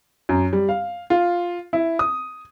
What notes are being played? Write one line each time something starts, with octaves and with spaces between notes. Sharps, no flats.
F#2
G3
F5
F4
E4
D#6